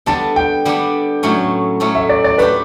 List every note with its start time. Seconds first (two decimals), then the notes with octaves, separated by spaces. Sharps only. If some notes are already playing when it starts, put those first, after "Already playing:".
0.06 D3 G3 B3 D4 A5
0.36 G5
0.65 D3 G3 B3 D4
1.23 A2 F#3 A3 C#4
1.80 A2 F#3 A3 C#4
1.95 E5
2.09 D5
2.24 D5
2.38 A3 D4 G4 B4